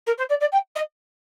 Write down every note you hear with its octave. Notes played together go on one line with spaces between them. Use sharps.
A#4
C5
D5
D5
G5
D#5